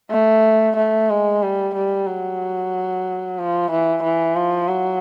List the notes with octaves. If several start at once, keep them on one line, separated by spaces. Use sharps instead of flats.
A3
A3
G#3
G3
G3
F#3
F3
E3
E3
F3
F#3